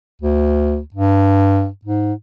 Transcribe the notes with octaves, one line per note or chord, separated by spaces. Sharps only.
D2
G2
G#2